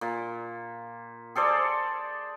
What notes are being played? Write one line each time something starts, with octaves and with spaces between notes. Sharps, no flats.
A#2
G#4 A4 C5 D5